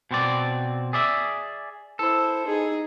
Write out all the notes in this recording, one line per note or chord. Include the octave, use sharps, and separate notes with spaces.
B2 C4 D5
G#4 D5 E5
E4 A4 C5
D#4 G#4